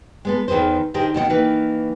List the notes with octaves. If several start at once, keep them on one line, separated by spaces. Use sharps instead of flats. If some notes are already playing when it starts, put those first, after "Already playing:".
G#3 B3 A4
E2 D#3 G#4 B4 C5
D3 D#3 G4 G#4 A#4 C5
B2 D#3 C5 F#5
D#3 E3 A#3 B4